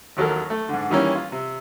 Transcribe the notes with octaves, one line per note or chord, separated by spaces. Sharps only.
A1 D#2 F#3 A4 A#4
A3
G#2 D3
D#3 E3 G3 A#3 C#4
F4
C3